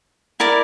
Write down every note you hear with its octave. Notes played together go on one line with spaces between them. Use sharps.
E4 A#4 D5